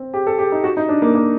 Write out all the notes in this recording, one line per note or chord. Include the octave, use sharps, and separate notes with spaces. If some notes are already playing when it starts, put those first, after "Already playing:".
Already playing: C4
G4
A4
G4
D#4
F#4
D#4
D4
A#3
A#3